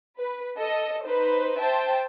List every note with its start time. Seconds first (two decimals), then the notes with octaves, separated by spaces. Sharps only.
0.18 B4
0.56 A4 D#5
1.06 D#4 B4 C5
1.59 C5 E5 G5 A5